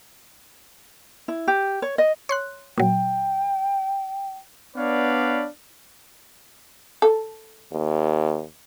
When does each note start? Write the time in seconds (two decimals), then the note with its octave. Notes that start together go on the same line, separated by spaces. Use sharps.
1.28 E4
1.47 G4
1.82 C#5
1.98 D#5
2.29 C#5 C6 F#6
2.78 A#2 F#3 G5
4.77 B3 D4 B4 C#5 D5 F5
7.02 A4
7.72 D#2